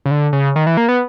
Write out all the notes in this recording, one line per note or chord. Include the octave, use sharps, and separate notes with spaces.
C#3
D3
C#3
D#3
E3
A#3
B3